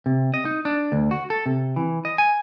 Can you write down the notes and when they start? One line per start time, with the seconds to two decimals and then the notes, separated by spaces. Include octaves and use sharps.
0.06 C3
0.34 D#5
0.45 D#4
0.65 D4
0.92 D2
1.11 F#4
1.30 A4
1.46 C3
1.76 E3
2.05 D#5
2.18 G#5